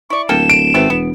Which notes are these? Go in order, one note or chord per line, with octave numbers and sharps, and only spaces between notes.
E4 D5 C#6
D1 A#3 A4 G5 E7
D7
G#1 A3 B3 C4
E1 B3